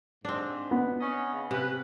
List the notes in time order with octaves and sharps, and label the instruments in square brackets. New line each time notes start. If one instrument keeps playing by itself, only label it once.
[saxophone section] G#2 [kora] C4 D4
[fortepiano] B3
[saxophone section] C#4 C#5 D#5
C#3
[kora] C3 [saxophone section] C#4 B4